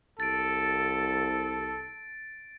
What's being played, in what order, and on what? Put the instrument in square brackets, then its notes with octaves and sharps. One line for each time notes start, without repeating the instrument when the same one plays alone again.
[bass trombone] C2 [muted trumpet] A4 [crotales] A6 D7